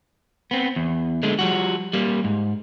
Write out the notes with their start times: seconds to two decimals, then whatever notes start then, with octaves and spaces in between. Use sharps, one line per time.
0.51 B3 C4
0.76 E2
1.23 D3 G#3 A3
1.39 F3 G3 F#4
1.93 G3 A#3
2.24 G#2